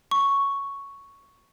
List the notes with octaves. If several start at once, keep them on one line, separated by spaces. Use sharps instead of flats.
C#6